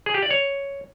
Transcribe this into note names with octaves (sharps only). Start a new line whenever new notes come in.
G#4
G4
D5
C#5